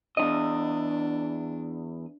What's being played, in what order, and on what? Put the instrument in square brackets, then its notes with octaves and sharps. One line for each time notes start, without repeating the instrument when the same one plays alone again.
[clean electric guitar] E2 D#3 D#5 [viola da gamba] D4